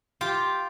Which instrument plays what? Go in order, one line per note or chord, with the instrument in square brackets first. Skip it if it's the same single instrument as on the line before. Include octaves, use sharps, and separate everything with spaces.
[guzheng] F4 G4